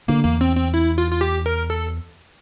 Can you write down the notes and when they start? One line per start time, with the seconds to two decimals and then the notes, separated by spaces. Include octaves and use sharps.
0.08 D3 A#3
0.24 E2 A#3
0.41 C4
0.57 C4
0.74 E4
0.98 F4
1.11 F4
1.21 G4
1.46 A#4
1.70 A4